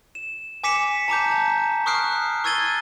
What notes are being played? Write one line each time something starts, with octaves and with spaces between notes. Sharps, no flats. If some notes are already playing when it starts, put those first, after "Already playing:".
E7
G#5 D6 B6 C#7 E7
A5 A#5 D6 G6
A5
C#6 D#6 F6 F#6 C7 D7
C#6 E6 G#6 A6 D#7 G7